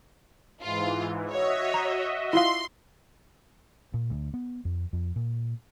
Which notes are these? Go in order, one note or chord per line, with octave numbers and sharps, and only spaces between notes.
G#2 E3 F4
F#4 C#5 D#5 E5
A#5
E4 F4 F5 C6
A#2
D2
B3
F2
F2
A#2